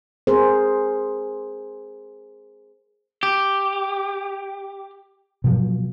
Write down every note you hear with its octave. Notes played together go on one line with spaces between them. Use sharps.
G#4 A#4 C5
G4
B2 F3 F#3